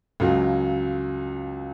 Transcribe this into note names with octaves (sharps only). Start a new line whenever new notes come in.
C#2 C#3 F#3